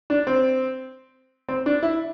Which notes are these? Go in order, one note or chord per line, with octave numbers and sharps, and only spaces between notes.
D4
C4
C4
D4
E4